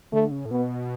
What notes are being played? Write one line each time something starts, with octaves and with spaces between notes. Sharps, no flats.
D3 A3
C#3
A2
B2 B3